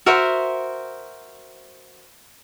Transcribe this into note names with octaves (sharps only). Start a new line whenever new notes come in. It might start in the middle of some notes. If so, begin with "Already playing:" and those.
F#4 A#4 C5 E5